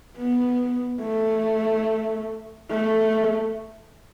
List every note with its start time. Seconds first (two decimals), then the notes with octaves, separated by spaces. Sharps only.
0.18 B3
1.01 A3
2.70 A3